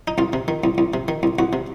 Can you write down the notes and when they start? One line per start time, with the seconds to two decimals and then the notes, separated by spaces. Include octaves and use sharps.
0.08 D#4
0.18 C2 F4
0.33 C3
0.48 D#3
0.64 C2
0.78 C2
0.94 C3
1.08 D#3
1.23 C2
1.39 C2 F#4
1.53 C3